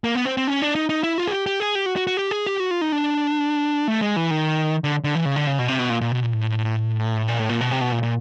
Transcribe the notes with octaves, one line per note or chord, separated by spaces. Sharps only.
A#3
B3
C4
C4
C#4
D4
D#4
D#4
E4
F4
G#4
G4
G4
G#4
G4
F#4
F#4
F#4
G4
G#4
G4
F#4
F4
D#4
D4
A3
G#3
E3
D#3
D3
D3
E3
C#3
D3
C#3
B2
C3
B2
A#2
A#2
B2
A#2
A2
A#2
A2
A#2
B2
C3
B2
A#2
A#2